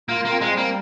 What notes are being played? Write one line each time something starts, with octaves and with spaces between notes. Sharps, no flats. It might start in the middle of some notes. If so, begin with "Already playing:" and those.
A#3 F4
A#3
C4
G#3
G3 A#3